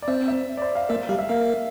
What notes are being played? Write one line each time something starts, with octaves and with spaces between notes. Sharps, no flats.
D5
C4 C5 E5
E5
D5
C5
F5
A#3 A#4 E5
G3 G4 F5
E5
A#3 A#4 F5